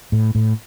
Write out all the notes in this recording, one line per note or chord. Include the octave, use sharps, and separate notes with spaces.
A2
A2